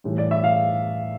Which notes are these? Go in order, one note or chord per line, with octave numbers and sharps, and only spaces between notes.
A2 E3 G3
D5
E5
F5